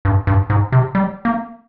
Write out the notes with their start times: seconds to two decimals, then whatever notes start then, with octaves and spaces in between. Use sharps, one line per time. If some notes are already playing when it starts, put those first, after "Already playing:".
0.05 G2
0.27 G2
0.50 G#2
0.72 C3
0.95 G3
1.25 A#3